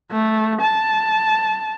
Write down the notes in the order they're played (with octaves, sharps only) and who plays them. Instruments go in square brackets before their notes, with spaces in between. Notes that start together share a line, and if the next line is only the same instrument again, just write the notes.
[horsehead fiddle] A3
A5